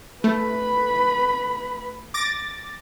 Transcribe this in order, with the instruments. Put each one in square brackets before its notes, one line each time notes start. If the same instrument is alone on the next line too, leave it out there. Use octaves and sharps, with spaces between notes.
[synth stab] A3 [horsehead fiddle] B4 B5
[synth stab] D6 A6 A#6